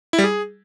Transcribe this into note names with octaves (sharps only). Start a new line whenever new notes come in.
E4
G3
G#4